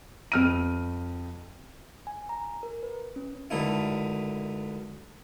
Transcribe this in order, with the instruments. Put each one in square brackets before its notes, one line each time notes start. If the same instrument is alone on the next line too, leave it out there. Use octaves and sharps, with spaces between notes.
[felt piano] F2 F6 D#7
[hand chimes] G#5
A#5
A#4
B4
C#4
[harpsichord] C#2 F#2 D3 A3 D#4 E4